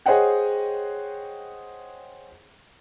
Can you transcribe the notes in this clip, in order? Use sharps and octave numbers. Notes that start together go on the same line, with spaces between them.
G#4 C5 C#5 D#5 F#5 G5